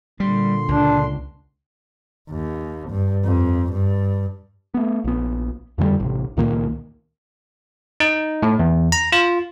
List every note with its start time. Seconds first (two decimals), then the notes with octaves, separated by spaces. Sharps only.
0.20 A#2 D3 G3 C6
0.68 C#2 D4
2.30 D#2
2.90 G2
3.25 F2
3.72 G2
4.74 A3 B3
5.04 A#1 B3
5.78 F2 D3 E3 G3
6.00 A1 C3
6.37 C#2 A#2 D#3 A#3
8.00 D#4
8.43 A2
8.59 E2
8.92 A#5
9.12 F4